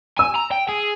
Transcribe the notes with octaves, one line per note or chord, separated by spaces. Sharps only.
G#5 E6
A#5
G5
G#4